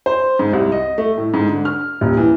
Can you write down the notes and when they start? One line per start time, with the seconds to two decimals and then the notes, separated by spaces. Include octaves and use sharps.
0.06 C5
0.39 G#2
0.53 C2
0.72 D#5
0.98 A3
1.17 A2
1.34 G#2
1.47 D3
1.65 F6
2.01 D#1
2.17 E3